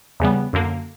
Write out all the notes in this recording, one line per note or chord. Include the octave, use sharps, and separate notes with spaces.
E2 C#3 G3 B3
F#2 D3 A#3